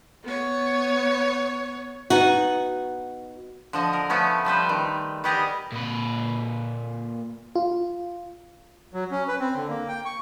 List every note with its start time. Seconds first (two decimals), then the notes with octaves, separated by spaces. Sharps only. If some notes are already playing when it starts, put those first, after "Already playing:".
0.23 B3 C#5
2.10 B3 D#4 F#4
3.73 D3 F3 D#5
3.93 A#4
4.09 F3 A3 B3 C#4 E4
4.45 F3 G3 B4 C5
4.69 D#3
5.24 G3 B3 G4 G#4 D#5 A#5
5.72 A#2 B4
7.55 F4
8.94 F#3
9.11 C#4
9.28 B4
9.40 C4
9.55 D3
9.69 A#3
9.88 G5
10.05 C#6